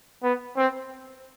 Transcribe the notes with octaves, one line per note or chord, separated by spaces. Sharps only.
B3
C4